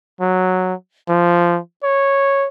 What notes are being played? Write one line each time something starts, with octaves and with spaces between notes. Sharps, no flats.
F#3
F3
C#5